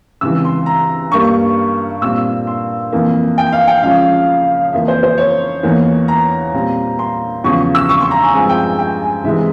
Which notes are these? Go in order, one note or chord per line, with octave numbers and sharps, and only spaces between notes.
C#2 C3 E3 E6
C6
A#5
G2 G3 A#3 C#6
A#2 G3 C4 E6
C6
F2 E3 A#3
G5
F5
G5
C#2 C#3 F3 F5
F2 E3 A#3 E5
C5
C5
C#5
E2 E3 A#3
A#5
A#2 G3 C4
C6
E2 C#3 F3 C#6
E6
C#6
C6
A#5
G#5
G2 F3 G#3 C4 G#5
G5
G5
G#5
C2 C3 E3 G#3 C4 E5